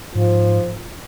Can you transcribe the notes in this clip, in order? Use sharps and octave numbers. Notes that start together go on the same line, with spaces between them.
G#2 F3